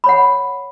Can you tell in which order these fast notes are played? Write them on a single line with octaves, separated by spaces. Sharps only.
B5 C#5 F#5